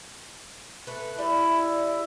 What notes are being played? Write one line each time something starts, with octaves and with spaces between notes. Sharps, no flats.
A3 B4
G3 E4